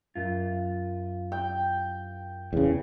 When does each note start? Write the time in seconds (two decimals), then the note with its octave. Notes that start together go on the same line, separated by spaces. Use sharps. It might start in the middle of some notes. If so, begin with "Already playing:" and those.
0.16 F#2 F4
1.32 G5
2.53 E2 C#3